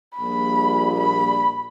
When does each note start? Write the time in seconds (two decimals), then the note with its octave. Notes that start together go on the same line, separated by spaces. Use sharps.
0.17 A#1 A#2 G3 A#3 B5
1.00 B5